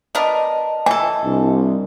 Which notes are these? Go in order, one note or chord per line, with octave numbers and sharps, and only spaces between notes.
B3 D4 A#4 D#5 A5
E3 A4 G#5
C2 D4